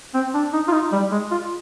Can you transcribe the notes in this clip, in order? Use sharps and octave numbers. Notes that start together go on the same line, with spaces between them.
C4
D4
D#4
F4
D#4
G3
G#3
F4